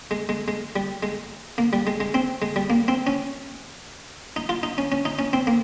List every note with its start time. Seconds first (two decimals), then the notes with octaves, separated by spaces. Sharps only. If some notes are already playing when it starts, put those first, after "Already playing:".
0.11 G#3
0.29 G#3
0.48 G#3
0.76 G3
1.03 G#3
1.58 A#3
1.73 G3
1.87 G#3
2.00 G#3
2.14 C4
2.42 G#3
2.56 G3
2.70 A#3
2.88 C4
3.07 C#4
4.36 D#4
4.49 F4
4.63 D#4
4.78 C#4
4.92 C#4
5.05 D#4
5.19 C#4
5.33 C4
5.47 A#3